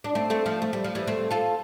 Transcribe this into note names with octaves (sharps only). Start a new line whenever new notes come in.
D4
A3 C4
A3 C4
F3 A3
A3
G3
F3
E3 G3
A3 C4
F4 A4